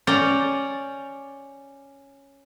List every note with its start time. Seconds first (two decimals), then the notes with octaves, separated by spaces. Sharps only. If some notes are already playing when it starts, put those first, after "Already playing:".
0.07 C#4 D5 G5 A#5